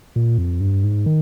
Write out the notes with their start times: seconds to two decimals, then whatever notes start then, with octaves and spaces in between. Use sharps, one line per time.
0.16 A#2
0.38 F2
0.61 G2
0.84 G#2
1.06 D#3